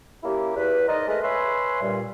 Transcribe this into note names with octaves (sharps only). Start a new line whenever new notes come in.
A#3 C#4 E4 G4
E2 B4
D#4 A#4 C5 D5 D#5
G#3 A3 G#4 A#4 B4 D#5
B4 C#5 E5 G#5 B5 C6
G2 A#2 G3